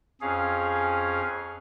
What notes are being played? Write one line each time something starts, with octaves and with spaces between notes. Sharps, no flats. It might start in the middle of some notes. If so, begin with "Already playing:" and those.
F2 C#4 G#4 F5